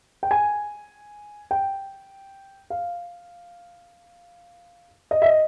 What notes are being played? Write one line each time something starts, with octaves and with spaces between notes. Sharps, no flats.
G5
G#5
G5
F5
D#5
E5
D#5